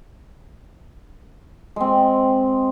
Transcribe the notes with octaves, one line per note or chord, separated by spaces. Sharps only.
G#3 C4